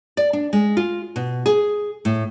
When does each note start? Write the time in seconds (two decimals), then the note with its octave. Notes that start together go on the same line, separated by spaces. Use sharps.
0.17 D5
0.33 D4
0.53 G#3
0.77 F4
1.16 B2
1.46 G#4
2.05 A2